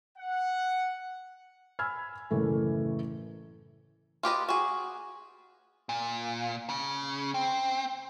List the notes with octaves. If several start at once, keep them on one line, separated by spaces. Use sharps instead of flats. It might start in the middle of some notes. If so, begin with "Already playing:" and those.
F#5
G#5 B5 E6 F6 G#6
F#1 A2 E3 A3
F4 G4 B4 D#5
F#4 G#4
A#2
C#3
C4